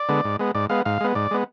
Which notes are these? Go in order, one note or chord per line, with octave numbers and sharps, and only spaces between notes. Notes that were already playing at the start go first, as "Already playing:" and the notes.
Already playing: D5
D3 G#3 B3
G#2
G#3 B3
G#2 D5
G#3 B3 F5
G#2 F5
G#3 B3
G#2 D5
G#3 B3